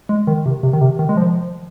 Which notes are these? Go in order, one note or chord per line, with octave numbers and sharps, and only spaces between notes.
G#3
D#3
C3
C3
D#3
C3
D#3
G#3
F3